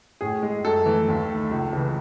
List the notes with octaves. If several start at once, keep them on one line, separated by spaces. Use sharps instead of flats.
A2 G#4
G#3
F#2 A4
E3 A3
D#2
D#3 A3
C#2
C#3 E3